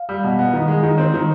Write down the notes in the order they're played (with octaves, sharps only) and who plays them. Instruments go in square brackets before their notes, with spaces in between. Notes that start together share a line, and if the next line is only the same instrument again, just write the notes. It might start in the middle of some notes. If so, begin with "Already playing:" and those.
Already playing: [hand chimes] F5
[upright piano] G3
B2
B3
D#3
G#3
D#3
C4
D#3